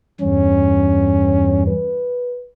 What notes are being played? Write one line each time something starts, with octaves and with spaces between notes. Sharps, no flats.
E2 G2 C#4
B4